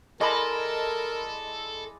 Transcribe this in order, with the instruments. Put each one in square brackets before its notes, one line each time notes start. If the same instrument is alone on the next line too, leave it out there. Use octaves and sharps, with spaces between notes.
[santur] G#3 E4 D5 [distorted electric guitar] A4 [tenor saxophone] A#4 [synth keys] D#5 B5